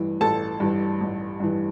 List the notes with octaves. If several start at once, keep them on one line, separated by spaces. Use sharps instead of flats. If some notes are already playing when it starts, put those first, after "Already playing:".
Already playing: A1 G2 E3
A1 A4 A5
G2 E3
A1
G2 E3